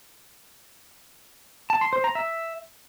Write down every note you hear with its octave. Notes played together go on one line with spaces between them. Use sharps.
A5
C6
C5
A#5
E5